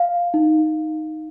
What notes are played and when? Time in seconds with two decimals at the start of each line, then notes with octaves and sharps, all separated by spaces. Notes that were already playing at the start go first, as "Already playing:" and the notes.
Already playing: F5
0.34 D#4